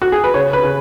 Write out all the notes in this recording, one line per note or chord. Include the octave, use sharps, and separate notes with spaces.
F#4
G#4
B4
C#3 C#5
B4
C#3